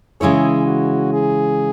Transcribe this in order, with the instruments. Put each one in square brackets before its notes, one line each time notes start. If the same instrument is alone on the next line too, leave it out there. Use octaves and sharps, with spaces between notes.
[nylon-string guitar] C#3 E3 G#3 E4 C#5 [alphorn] G#4
[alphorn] F#4
G#4